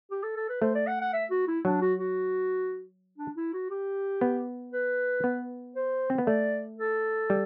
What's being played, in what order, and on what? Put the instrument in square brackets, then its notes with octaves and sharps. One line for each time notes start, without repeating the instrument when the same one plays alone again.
[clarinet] G4
A4
A4
B4
[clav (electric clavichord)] A3 [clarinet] C5
[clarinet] D5
F#5
F#5
E5
F#4
E4
[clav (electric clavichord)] F#3 [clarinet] D4
[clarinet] F#4
F#4
D4
E4
F#4
G4
[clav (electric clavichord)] B3
[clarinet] B4
[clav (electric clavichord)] B3
[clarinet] C5
[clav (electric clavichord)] C4
B3
[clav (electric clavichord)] A3 [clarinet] D5
[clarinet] A4
[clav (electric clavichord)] G3